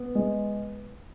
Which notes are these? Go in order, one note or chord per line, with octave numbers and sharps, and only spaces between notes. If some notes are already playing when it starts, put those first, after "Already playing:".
Already playing: B3
G#3